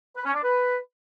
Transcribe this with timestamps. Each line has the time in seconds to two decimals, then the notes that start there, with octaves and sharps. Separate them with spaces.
0.16 B4
0.25 C#4
0.34 D4
0.43 B4